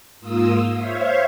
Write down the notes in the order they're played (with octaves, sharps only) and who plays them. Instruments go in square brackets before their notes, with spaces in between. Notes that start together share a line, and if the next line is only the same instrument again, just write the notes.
[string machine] G#2 A#3 F4 D#6 E6
C5 C#5 E5 F5